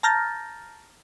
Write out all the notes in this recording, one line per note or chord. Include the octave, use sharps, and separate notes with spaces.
A5 A#5 F6 G6 A6 A#6